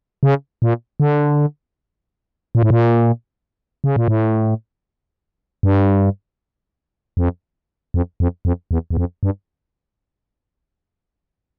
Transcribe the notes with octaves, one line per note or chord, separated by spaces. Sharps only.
C#3
A#2
D3
A#2
A2
A#2
C#3
A#2
A2
G2
F2
F2
F2
F2
E2
E2
F2
G2